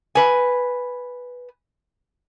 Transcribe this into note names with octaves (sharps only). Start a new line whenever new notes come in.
B4 G#5